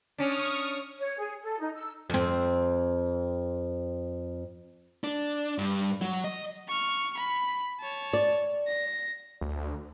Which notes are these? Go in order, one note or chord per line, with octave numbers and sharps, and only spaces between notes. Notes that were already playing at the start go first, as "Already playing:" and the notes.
C#4 D4 C#6 D#6 F6
C#5
G#4
A4
D#4
E6
F2 C4
D4
G2
F#3
D#5
C#6 F6
B5
C#5 A5
D5
A#6
D2